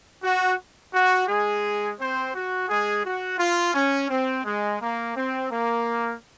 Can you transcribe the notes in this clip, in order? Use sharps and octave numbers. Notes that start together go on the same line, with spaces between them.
F#4
F#4
G#3 G#4
C4 C5
F#4
G#3 G#4
F#4
F4
C#4
C4
G#3
A#3
C4
A#3